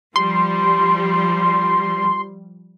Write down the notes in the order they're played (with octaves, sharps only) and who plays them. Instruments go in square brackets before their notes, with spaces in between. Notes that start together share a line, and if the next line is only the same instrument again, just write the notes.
[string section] F3 G3 [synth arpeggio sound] C6